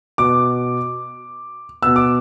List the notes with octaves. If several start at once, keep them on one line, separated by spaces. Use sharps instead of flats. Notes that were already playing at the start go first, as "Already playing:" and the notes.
B2 B3 D6
B2 B3 E6
D6